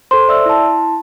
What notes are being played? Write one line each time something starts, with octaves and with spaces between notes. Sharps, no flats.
A4 C5 C6
D5 E5 E6
E4 A5